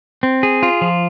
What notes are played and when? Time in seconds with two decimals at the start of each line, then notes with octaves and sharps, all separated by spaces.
0.23 C4
0.43 G#4
0.63 F4
0.81 F3